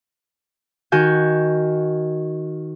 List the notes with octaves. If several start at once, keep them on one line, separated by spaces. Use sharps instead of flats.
D#3 F#4 G#5 G6